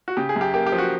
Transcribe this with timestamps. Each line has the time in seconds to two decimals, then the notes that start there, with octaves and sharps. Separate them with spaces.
0.08 F#4
0.17 C#3 G4
0.29 G#4
0.36 F#2
0.41 G4
0.54 A#3 G4
0.67 G4
0.72 F3
0.78 F#4